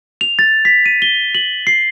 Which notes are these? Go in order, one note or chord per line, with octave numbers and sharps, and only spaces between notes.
F7
A6
B6
D#7
G7
F#7
C7